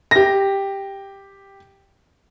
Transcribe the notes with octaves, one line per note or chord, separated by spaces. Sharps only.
G4 A#6